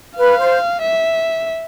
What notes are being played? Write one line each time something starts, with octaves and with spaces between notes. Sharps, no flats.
B4 F5
C5
E5